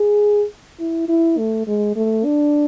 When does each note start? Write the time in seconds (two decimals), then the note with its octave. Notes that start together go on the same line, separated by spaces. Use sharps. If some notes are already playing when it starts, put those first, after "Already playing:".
Already playing: G#4
0.80 E4
1.09 E4
1.38 A3
1.67 G#3
1.96 A3
2.25 D4